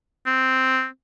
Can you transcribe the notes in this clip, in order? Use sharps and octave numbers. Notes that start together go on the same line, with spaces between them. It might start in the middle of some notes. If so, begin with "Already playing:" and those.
C4